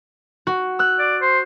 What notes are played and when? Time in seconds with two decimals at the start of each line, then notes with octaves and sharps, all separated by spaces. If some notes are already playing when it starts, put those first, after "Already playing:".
0.47 F#4
0.79 E6 F#6
0.99 D5
1.21 C5